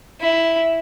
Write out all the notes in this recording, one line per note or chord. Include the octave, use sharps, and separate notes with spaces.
E4